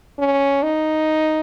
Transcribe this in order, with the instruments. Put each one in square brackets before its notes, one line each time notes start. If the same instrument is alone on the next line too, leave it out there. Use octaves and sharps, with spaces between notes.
[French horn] C#4
D#4